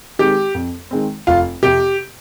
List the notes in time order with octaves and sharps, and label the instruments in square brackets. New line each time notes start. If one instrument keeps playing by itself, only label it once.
[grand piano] D#3 G#3 C4 [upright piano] G4
[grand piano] F2
D#3 G#3 C4
[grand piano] F1 [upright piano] F4
[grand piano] F2 C3 [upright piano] G4